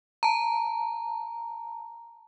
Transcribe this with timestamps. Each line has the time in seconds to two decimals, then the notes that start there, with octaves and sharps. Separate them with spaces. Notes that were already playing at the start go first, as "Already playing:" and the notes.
0.23 A5 A#5